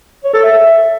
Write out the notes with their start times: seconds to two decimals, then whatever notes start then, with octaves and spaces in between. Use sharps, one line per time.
0.24 C#5
0.34 A4
0.43 E5